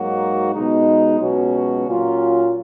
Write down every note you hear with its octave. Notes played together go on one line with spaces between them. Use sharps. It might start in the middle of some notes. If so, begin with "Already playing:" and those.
Already playing: G#2 F#3 A#3 D#4 F#4
C#2 B2 G#3 D#4
C#2 B2 F#3 C#4 F#4
A#2 F#3 C#4 F4